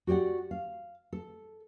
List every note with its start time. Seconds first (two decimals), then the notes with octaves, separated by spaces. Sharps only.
0.07 F#4 G4 C5 D5 F#5
0.51 F5
1.12 A4